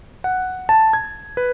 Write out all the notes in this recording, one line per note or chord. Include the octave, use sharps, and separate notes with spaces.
F#5
A5
G#6
B4